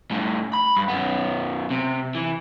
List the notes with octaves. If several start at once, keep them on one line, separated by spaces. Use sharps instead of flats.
A2 G3
B5
G2
F#2 B3
C3
E3